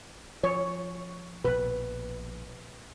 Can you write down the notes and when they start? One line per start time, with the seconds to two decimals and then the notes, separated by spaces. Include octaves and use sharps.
0.44 F3 C#5
1.45 A#1 B2 B4